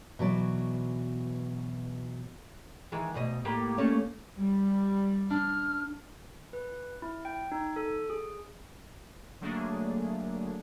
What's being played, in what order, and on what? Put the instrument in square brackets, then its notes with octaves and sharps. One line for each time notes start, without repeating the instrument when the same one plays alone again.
[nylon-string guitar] B2 E3 F#3 D5
[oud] D#3 E3 G#3
D2 B2 D#5
A2 A#3 G4
A3 A#3 C#4
[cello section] G3
[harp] D4 [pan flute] F6
[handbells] B4
E4
G5
D#4
A4
G#4
[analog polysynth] D3 F#3 A3 A#3 D4 G#4